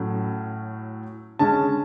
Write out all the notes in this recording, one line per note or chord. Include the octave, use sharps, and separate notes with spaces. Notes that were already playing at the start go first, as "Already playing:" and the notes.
Already playing: A2 F#3 A3 C#4
D3 G#3 C#4 A5